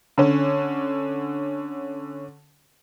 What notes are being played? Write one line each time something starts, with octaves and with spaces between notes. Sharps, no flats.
D3 C#4